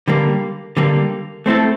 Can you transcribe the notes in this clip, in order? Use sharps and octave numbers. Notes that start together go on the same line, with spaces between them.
D3 G3 A#3
D3 G3 A#3
A3 C4 E4 A4